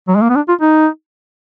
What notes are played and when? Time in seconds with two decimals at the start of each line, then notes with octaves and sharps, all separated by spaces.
0.08 F#3
0.15 G#3
0.21 A#3
0.30 B3
0.36 D4
0.49 F4
0.61 D#4